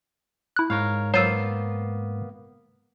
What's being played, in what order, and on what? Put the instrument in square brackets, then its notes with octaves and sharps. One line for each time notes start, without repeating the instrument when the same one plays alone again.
[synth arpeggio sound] E4 F#6
[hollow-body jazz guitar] G#2 [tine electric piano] A#4 C#5 F5
[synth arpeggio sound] F#3 E6 [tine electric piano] A#3 B3 [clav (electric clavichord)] F4 C5